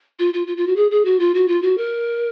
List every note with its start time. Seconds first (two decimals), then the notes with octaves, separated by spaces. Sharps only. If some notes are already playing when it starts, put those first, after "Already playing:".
0.19 F4
0.34 F4
0.47 F4
0.57 F4
0.67 F#4
0.76 G#4
0.91 G#4
1.05 F#4
1.19 F4
1.35 F#4
1.48 F4
1.62 F#4
1.78 A#4